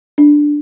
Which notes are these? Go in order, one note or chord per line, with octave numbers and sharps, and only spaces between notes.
D4